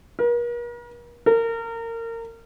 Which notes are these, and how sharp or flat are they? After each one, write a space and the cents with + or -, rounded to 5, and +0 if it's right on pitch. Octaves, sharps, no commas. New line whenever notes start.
A#4 +45
A#4 -25